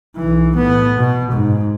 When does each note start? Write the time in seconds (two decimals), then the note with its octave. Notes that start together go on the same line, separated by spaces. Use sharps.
0.16 B1 E3
0.56 A2 B3
0.98 B2
1.31 G#2